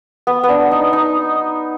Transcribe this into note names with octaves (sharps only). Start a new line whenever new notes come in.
B3
B3
D4
D#4
D#4